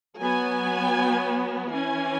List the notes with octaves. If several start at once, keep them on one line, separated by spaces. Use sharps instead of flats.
F#3 B3 G#5
E3 C#4 G#5